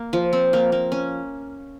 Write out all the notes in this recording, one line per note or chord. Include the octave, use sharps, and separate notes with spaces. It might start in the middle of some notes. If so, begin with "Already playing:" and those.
Already playing: A#3
F3
C4
A#3
A#3
C#4